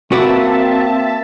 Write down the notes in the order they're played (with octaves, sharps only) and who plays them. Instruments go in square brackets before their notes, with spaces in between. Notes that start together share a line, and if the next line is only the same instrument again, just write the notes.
[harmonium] A#3 [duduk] C4 [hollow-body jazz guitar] F#4 B4 D5 [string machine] E5 A5